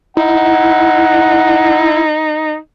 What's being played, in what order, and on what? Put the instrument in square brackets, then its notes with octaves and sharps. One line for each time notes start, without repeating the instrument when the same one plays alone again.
[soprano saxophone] D#4 [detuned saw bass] E4 [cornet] F#5